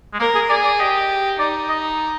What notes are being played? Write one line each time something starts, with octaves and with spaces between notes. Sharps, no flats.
G#3
A#3 A#4
G#4
G#4 D5
D5
G4 D#5
D#4 D5
D#5